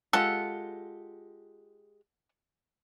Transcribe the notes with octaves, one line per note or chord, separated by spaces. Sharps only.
G#3 F4 G4 A4 F#5